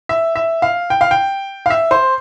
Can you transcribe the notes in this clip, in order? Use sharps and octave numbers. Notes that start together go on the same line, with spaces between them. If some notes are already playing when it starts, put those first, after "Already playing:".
E5
E5
F5
G5
F5
G5
F5
E5
C5